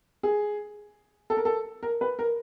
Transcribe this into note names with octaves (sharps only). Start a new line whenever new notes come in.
G#4
A4
A#4
A4
A#4
B4
A#4